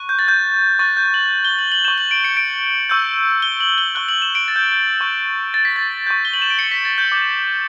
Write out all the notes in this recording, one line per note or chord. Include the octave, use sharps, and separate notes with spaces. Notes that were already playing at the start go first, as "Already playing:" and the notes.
Already playing: C#6 F#6
G6
A6
G6
C#6 F#6 A6
G6
F#7
G7
F#7
F#7
C#6 G6 E7
F#7
D7
C#7
D7
C#6 E6 G6
G7
F#7
G7
C#6 F#6 G7
F#7
E7
D7
A6
G6
G6
C#6 G6
A6
B6
A6
C#6 G6
G7
F#7
E7
D7
C#7
B6
A6
G6
D6 G6